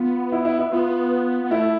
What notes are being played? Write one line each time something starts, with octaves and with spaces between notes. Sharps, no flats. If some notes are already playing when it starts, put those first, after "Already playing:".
Already playing: B3 F4
E4
E4
E4
B3 F4
B3
A3 E4